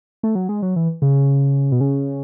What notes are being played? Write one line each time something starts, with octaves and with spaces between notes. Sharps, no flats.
A3
F#3
G#3
F#3
E3
C#3
B2
C#3